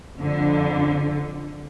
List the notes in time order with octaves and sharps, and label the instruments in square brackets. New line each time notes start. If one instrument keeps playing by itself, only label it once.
[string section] F2 D3